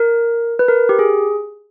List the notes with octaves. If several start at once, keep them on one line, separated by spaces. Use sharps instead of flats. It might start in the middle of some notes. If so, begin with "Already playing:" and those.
Already playing: A#4
B4
A#4
G4
G#4